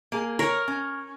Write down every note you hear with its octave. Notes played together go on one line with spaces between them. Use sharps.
A#3 G#4
A#4 C#5
C#4